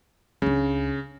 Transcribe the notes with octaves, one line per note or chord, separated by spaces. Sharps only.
C#2 C#3 D4